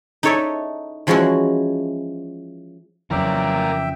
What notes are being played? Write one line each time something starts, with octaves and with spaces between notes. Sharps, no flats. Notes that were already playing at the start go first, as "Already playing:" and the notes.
D#4 E4 A4 C#5 D5 E5
E3 F3 G#3 C#4 E4 F#4
F2 C#3 E3 F#3 A#4 D5 E5 G5